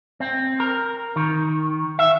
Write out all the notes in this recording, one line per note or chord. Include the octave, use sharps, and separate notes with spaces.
C4
A#4
D#3
E5